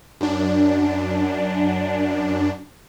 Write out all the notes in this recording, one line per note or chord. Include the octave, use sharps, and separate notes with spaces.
F#2 D4